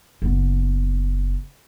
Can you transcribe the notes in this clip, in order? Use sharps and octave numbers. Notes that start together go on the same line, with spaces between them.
F#1 B3